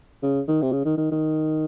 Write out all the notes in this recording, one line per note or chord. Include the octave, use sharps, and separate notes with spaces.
C#3
D#3
C3
C#3
D#3
D#3
D#3